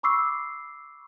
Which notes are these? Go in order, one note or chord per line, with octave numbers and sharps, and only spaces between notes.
B5 C#6 D6 E6 C7